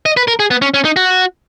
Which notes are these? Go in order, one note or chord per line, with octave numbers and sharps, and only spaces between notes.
D#5
B4
A#4
G#4
B3
C#4
C#4
D#4
F#4